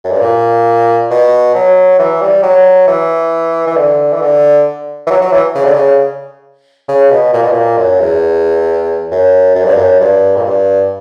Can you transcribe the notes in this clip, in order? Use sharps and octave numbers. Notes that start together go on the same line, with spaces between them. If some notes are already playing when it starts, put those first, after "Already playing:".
F#2
G2
A#2
B2
F#3
E3
G3
F#3
E3
E3
D3
E3
D3
E3
F#3
F#3
E3
C#3
D3
C#3
C#3
B2
A#2
B2
A#2
F#2
E2
F#2
F#2
G2
F#2
G2
A#2
G2